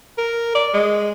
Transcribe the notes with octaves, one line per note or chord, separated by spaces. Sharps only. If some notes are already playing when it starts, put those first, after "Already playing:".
A#4
D5
G#3